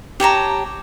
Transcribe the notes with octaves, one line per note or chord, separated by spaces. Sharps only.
G4 C#5 A5 A#5